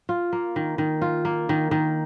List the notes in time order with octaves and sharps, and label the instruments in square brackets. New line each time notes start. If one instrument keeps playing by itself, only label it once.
[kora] F4
A#3
D#3
D#3
F4
A#3
D#3
D#3